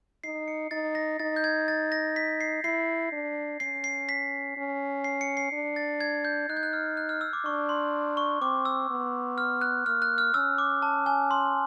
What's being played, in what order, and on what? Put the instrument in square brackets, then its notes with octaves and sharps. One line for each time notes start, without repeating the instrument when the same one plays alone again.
[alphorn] D#4 [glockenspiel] C7
[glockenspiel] C#7
[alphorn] D#4 [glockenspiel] A6
[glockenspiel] A#6
[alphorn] D#4 [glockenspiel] A6
[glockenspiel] G6
G#6
A6
A#6
B6
C7
[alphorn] E4 [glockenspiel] C7
[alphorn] D4
[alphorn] C#4 [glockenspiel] C7
[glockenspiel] C7
B6
[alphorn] C#4
[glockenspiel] C7
C#7
C7
[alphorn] D4
[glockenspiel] A6
G#6
G6
[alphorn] D#4 [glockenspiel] F#6
[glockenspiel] G6
F#6
F6
F#6
F6
E6
D6
[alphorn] D4 [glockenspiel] C#6
[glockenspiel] C6
C#6
[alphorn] C4 [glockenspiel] D6
[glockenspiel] E6
[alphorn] B3
[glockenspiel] F6
F#6
[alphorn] A#3 [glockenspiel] F6
[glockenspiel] F#6
F6
[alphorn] C#4 [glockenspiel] E6
[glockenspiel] D6
A5
G#5
C6